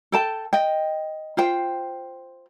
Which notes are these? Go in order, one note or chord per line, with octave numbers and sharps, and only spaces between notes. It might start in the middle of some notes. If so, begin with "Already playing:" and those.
A4 G5 A5
D#5 G5
F4 C5 G5